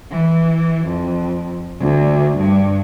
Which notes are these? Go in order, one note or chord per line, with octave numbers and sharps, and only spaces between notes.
E3
F2
D2
G2